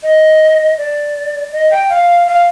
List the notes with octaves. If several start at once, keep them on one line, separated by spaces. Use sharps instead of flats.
D#5
D5
D#5
G5
F5
F5